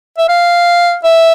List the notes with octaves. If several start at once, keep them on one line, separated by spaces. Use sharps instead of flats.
E5
F5
E5